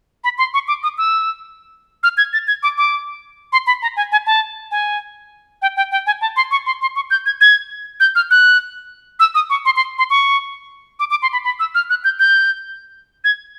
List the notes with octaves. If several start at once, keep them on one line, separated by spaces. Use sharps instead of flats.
B5
C6
C#6
D6
D#6
E6
F6
G#6
A6
G#6
D6
D6
C6
B5
A#5
G#5
G#5
A5
G#5
G5
G5
G5
G#5
A5
C6
C#6
C6
C6
C#6
G6
G#6
G#6
G6
F6
F#6
E6
D#6
C#6
C6
C6
C6
C#6
D6
D6
C6
B5
B5
E6
F6
F#6
G6
G6
G#6